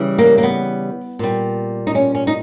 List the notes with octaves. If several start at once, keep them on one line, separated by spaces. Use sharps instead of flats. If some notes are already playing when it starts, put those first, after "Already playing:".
Already playing: C#3 E3 G3
A#3
A#3
B3
A#2 G3
D#4
C#4
C#4
D#4